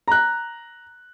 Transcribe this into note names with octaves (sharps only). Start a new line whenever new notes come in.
A#5 F#6